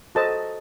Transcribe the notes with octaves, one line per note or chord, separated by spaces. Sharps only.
F#4 A4 C5 D#5 A5